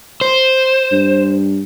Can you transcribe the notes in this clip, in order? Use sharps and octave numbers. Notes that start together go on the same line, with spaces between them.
C5
G2